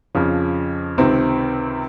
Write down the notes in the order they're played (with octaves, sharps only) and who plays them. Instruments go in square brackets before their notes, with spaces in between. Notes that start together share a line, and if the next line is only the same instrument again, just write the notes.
[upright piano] F2 C#3 F3
C#2 C3 D#3 C4